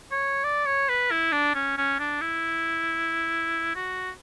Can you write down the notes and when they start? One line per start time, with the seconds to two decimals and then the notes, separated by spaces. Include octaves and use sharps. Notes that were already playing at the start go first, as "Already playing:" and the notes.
0.11 C#5
0.44 D5
0.66 C#5
0.89 B4
1.11 E4
1.32 D4
1.55 C#4
1.78 C#4
1.99 D4
2.21 E4
3.76 F#4